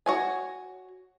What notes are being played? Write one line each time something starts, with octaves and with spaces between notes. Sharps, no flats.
F#4 C#5 G#5